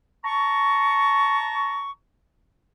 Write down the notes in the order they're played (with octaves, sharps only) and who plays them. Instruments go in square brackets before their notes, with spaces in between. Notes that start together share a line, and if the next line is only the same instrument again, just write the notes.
[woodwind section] A5 A#5 C#6